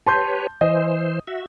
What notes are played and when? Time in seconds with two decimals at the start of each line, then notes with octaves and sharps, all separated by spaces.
0.06 G4 B4 C#5 A5 C6 G6
0.61 E3 C5 D#5
1.27 F#4 E5